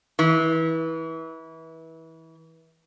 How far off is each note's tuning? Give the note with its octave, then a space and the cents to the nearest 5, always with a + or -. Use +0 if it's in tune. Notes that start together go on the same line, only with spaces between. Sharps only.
E3 -25